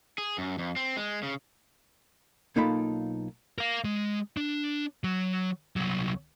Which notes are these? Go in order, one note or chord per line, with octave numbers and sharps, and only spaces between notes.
G#4
F#2
F2
C4
G#3
C#3
B1 A#3 D#4 F4 A4 B5
A#4 F5
G#3
D4
F#3
C2 F#3